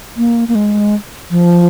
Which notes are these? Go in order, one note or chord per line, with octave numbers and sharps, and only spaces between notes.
A#3
A#3
G#3
F3